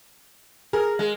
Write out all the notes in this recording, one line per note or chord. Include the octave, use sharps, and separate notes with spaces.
G#4 A#4
G#3